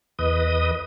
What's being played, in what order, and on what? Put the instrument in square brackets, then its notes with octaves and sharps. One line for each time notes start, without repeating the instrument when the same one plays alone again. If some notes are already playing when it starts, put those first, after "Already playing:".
[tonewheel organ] E2 B4 D#5 D#6